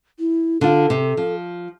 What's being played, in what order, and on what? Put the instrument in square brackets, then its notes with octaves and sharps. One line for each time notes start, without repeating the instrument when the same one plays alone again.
[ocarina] E4
[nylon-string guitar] D3 F4 [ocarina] A4
[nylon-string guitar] C3
F3